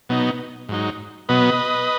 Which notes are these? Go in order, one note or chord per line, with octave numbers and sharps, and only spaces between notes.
B2 F#3 B3 D#4
G#2 F#3 D#4
B2 F#3 B3 B4 D#5